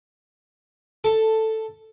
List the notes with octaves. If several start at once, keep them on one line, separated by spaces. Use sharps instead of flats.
A4